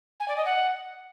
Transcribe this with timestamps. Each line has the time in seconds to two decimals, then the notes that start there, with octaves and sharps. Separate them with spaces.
0.20 G#5
0.28 D5
0.37 D#5
0.45 F#5